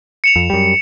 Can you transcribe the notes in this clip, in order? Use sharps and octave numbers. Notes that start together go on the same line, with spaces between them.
C#7 E7 F7
F2
F#2 G3